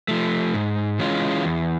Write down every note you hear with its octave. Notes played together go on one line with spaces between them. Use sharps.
F3 A3
G#2
E3 G#3 C#4 F4
E2